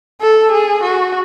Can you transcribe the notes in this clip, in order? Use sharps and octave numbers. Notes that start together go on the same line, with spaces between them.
A4
G#4
F#4